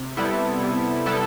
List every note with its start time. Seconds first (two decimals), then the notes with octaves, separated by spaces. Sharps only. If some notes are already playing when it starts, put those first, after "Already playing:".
Already playing: C3
0.17 G3 B3 E4 A4
0.61 C3
1.06 G3 B3 E4 A4